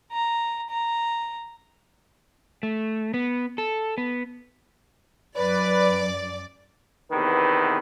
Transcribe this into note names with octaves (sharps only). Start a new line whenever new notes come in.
A#5
A#5
A3
B3
A4
B3
F#2 B4 D5
E2 C3 D#3 B3 B4